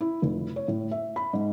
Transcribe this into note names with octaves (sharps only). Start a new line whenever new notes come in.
E4
F1
C#5
A2
E5
B5
G#2